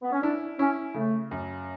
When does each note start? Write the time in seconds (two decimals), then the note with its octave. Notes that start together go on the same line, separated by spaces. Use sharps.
0.02 B3
0.12 C#4
0.23 D4 E4
0.59 C#4 E4
0.94 C#3 A3
1.31 F#2